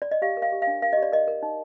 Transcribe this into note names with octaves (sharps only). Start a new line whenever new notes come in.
D5
D#5
G4 F5
A#4
F5
G4
F5
D4
A#4 F5
G4 D#5
D5
A#4 D#5
A#4
D#4